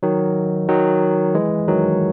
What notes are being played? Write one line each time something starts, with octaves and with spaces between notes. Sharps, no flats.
D#3 F#3
D#3 F#3
E3 G#3
D#3 F#3